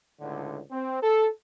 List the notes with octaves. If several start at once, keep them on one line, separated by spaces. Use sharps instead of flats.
C#2 A2 D3
C4
A4